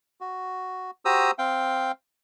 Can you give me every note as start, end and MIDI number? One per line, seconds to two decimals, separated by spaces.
0.20 0.91 66
1.05 1.31 66
1.05 1.31 67
1.05 1.31 72
1.05 1.31 82
1.05 1.31 87
1.05 1.31 88
1.38 1.92 60
1.38 1.92 77
1.38 1.92 79